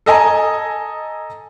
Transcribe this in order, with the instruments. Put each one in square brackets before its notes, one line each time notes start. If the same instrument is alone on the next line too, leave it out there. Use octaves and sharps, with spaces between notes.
[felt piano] A4 D#5 G#5 A#5